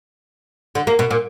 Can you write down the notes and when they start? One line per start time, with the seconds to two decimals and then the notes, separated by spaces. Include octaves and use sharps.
0.75 D3
0.87 A#3
0.99 B2
1.11 A#2